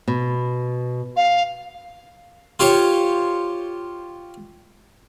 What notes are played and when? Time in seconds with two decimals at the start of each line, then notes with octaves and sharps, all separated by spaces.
0.08 B2
1.16 F5
2.59 F4 G4 C5 C#5